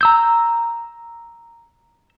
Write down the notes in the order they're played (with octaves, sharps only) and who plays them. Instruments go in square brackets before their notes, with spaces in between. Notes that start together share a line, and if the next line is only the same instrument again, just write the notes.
[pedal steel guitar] A#5 E6 G6